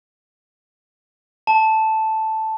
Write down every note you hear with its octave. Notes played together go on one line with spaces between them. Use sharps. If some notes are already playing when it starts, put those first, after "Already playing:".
A5